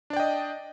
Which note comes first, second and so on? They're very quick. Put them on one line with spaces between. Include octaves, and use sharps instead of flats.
D4 D5 G5 D#5